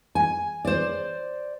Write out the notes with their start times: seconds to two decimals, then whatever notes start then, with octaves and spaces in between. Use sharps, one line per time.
0.15 G#5
0.65 C5 D5